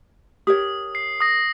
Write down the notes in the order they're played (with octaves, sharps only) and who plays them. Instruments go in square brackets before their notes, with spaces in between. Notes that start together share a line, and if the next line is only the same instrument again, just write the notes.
[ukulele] G4 A#4 C#5 [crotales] D#6
[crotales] C7
D#6 A#6